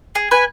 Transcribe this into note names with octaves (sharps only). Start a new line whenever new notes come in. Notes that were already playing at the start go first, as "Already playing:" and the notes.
G#4
B4 G#5